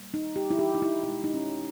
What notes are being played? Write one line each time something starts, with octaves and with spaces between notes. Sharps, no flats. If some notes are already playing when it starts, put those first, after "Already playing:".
Already playing: A#2 G3 A#3
D#4
G4
E4
G4
D#4
E4
B2 G#3 E4
D#4
C#4